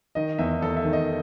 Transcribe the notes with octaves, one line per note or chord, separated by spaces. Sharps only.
D#3 D#5
E2 E5
E2 A4
E5
D#3
D#5